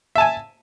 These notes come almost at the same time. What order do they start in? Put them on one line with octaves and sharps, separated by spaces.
E5 A5 G#5